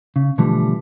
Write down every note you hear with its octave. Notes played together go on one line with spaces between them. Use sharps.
C#3
B2 D3 E3 F3 G3 A3